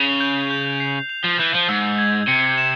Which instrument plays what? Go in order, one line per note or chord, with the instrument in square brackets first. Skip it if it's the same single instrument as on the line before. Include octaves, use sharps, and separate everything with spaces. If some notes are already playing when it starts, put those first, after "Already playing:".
Already playing: [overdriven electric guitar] C#3 [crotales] F7
[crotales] G6
G6
C7
F7
[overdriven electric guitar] F3
[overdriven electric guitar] E3 [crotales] G6
[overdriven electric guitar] F3
[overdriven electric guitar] G#2 [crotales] E6
[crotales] G#6
[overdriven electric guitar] C3 [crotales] C#7
[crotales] E7